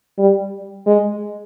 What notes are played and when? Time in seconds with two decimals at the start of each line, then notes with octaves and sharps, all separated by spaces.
0.18 G3
0.86 G#3